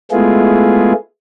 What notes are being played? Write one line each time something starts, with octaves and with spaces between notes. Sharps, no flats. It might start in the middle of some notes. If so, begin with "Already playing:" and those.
G#3 A3 B3 E4 F4 G#4